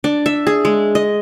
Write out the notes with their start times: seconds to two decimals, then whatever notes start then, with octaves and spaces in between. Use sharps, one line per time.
0.04 D4
0.26 E5
0.47 G#4
0.65 G#3
0.95 D#5